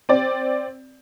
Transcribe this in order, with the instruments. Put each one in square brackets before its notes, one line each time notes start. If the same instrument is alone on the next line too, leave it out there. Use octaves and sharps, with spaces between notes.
[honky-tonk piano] C4 D5